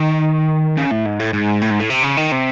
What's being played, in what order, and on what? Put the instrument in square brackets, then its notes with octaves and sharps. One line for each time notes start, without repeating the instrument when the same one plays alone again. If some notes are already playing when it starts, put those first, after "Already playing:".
Already playing: [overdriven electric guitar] D#3
C#3
A2
G#2
A2
G#2
A2
G#2
A2
C3
C#3
D#3
C3